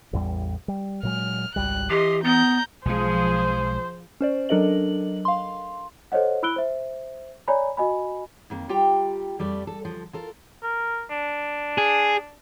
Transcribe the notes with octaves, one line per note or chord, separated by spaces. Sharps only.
A1 E2 G3
G3
A#2 F#3 G#3 F6
G#1 C#2 G3 F#6
E3 G4 D#5 C6
B3 A#5 G6
B1 F3 G#3 G#4 C5
C#4 C5 D5
F#3 D4 A4 A#4 D#5 F#7
F5 C6
A4 C5 C#5 D#5 F#5
E4 B5 E6 F#6 D7 G7
C5 E5
C#5 D5 G#5 A#5 B5
F#4 D#5 G#5 B5
F2 D#3 A#3
G3 F4 G4 G5 A#5
F2 G3 A3 D5
A4
D2 F3
F4 A4 A#4
A#4
D4
G#4